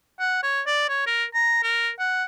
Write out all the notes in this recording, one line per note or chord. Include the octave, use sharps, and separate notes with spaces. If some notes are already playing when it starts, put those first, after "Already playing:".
F#5
C#5
D5
C#5
A#4
A#5
A#4
F#5